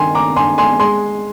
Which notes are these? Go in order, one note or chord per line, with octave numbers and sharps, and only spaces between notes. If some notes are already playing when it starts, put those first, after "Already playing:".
Already playing: G2 D#3 G#5 C6
A#5 D6
G2 G#5 C6
G#5 C6
G#3 G#5 C6